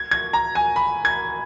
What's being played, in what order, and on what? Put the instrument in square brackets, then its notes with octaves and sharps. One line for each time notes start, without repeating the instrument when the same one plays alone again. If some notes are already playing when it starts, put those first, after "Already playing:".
Already playing: [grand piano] G#6
G#6
A#5
G#5
B5
G#6